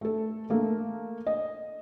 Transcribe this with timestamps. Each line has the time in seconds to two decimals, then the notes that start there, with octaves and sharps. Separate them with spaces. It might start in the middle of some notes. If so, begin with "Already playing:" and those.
0.01 A3 A4
0.50 A3 A#3 A4
1.27 D#5